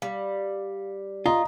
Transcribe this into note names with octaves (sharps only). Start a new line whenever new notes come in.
G3 F5
F4 D#5 F5 A#5 D#6